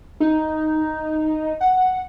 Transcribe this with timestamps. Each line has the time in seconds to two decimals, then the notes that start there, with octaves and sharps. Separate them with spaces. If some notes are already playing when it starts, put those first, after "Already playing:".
0.20 D#4
1.61 F#5